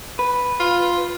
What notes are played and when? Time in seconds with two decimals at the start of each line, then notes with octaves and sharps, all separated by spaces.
0.19 B4
0.60 F4